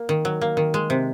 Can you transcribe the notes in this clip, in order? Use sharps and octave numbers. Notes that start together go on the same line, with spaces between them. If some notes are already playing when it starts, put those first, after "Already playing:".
Already playing: A#3
D#3
F#3
A#3
D#3
G#3
C3